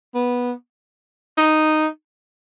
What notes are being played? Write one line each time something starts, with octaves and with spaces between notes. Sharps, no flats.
B3
D#4